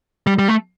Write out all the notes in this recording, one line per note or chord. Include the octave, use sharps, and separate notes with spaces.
G3
G3
A3